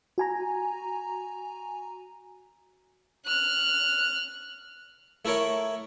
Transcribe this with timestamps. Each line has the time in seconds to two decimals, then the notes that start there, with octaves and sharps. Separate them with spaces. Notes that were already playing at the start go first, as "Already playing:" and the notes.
0.18 F#4 G#5 A#5
3.26 F6 F#6
5.25 A3 E4 A4 A#4 C#5